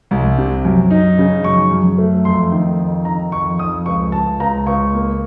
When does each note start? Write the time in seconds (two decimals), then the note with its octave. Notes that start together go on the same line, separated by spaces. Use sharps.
0.11 C2
0.38 C3
0.65 F#2
0.90 D#4
1.18 C#3
1.44 F#2 C#6
1.71 F#2
1.98 A3
2.25 F2 C6
2.51 D#3
2.79 F2
3.05 D#3 A#5
3.32 F2 C#6
3.59 F2 D#6
3.86 C#2 C#6
4.12 C#2 A5
4.40 C#2 A#5
4.66 C#2 C#6
4.93 A#3